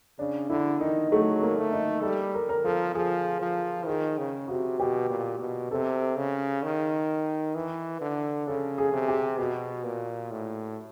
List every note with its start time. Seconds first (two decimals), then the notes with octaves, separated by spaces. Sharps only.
0.19 C#3 D4
0.50 D3 E4
0.81 D#3 D#4
1.11 F#3 A3
1.43 A#3
1.57 A3
1.73 D#4
2.03 G3 A4
2.34 A#4
2.49 A#4
2.64 F3 A4
2.95 F3 G#4
3.42 F3
3.87 D#3 G#4
4.18 C#3
4.48 C3 F#4
4.79 B2 G4
5.10 A#2
5.40 B2
5.71 C3 A4
6.17 C#3
6.63 D#3
7.55 E3
8.01 D3
8.47 C#3 A4
8.78 G#4
8.93 C3
9.08 G4
9.39 B2 F#4
9.84 A#2
10.31 A2